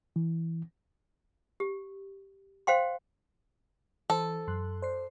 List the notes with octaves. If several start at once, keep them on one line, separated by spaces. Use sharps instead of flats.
E3
G4
C5 F5 G5 C6
E3 A4 C5
F#2 C6 F#6
C5 D5 C7